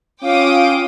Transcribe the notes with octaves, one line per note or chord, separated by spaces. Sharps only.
C#4 F4 F5 G5 D6 D#6